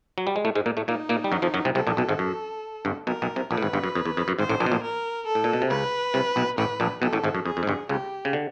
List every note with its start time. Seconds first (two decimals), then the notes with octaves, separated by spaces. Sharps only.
0.18 F#3
0.27 G3
0.36 G#3
0.45 A2 A3
0.55 G#2 G#3
0.66 A#2 A#3
0.77 A2 A3
0.88 A#2 A#3 D#4
1.09 A#2 A#3
1.24 G3
1.32 F#2 F#3
1.42 F2 F3
1.54 F#2 F#3
1.65 C2 C3
1.75 C2 C3 A4
1.87 A#1 A#2
1.97 B1 B2
2.09 G#1 G#2
2.19 F#2
2.85 G1 G2
3.07 B1 B2 A#4
3.22 B1 B2
3.36 C2 C3
3.51 A#1 A#2 B4
3.57 A2
3.62 G#1 G#2
3.73 G1 G2
3.84 F#2
3.95 F2
4.05 E2
4.17 F2
4.28 F#2
4.39 G#1 G#2 C5
4.49 A1 A2
4.60 A#1 A#2
4.66 B2
4.72 A#1 A#2
4.83 A#4
5.27 A4
5.35 A2
5.44 A#2
5.53 B2
5.62 C3
5.70 C#2 C#3 B4
6.14 C2 C3
6.36 B1 B2
6.58 A1 A2 B4
6.80 A#1 A#2
7.02 B1 B2 A4
7.13 A1 A2
7.24 G#1 G#2
7.35 F#2
7.46 F2 G#4
7.57 F2
7.63 G#2
7.67 G1 G2
7.89 C#2 C#3 G4
8.25 C#3
8.33 D3